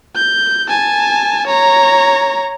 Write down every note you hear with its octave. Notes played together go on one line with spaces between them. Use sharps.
G6
G#5 A5
C#5 A#5